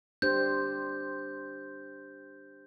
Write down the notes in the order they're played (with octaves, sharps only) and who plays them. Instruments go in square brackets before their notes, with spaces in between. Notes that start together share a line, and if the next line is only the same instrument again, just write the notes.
[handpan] D4 G4 C5 [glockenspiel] G6